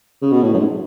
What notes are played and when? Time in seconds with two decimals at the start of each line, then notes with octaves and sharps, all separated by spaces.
0.22 C#3
0.31 B2
0.42 A2
0.54 F#2
0.58 G#2